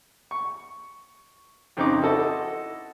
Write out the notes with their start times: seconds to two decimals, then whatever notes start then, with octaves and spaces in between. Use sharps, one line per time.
0.31 C#6
1.77 F2 C#3 C4 D#4 C#6 D6
2.01 E4 F#4 A4 D#5